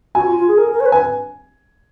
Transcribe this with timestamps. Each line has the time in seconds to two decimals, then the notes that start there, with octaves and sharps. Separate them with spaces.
0.15 F#4 G#5
0.26 F4
0.36 F4
0.48 G#4
0.57 A#4
0.72 A#4
0.80 C#5
0.85 B4
0.92 G#5